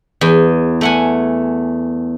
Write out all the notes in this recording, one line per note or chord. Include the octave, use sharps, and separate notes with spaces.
E2
A3 F#5 G#5